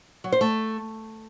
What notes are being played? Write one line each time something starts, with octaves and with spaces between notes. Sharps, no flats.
F#3
C5
A3